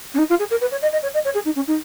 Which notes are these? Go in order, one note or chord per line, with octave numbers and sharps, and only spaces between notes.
C#4
D#4
F4
G#4
A#4
B4
C#5
D#5
D#5
C#5
D#5
C#5
G#4
D#4
C#4
D#4